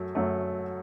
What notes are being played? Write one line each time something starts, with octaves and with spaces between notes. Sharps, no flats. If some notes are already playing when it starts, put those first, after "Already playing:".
Already playing: F#2 F#3 A3
F#2 F#3 A3